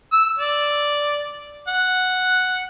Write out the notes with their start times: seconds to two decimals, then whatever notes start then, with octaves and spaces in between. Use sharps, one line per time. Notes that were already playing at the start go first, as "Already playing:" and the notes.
0.12 E6
0.39 D5
1.68 F#5